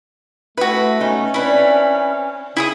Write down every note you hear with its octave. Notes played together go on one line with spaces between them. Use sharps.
A3 E4 F#4 B4
A3 B3 C#4 D#4
C4 D4 E4 B4
C#3 E4 G#4 D#6